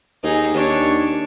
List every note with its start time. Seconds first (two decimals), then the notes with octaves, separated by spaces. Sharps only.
0.24 D#2 D#4 G#4
0.54 D#2 D4 C#5